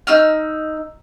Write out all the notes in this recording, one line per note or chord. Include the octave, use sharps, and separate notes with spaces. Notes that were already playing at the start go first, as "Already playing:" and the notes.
D#4 E6 F6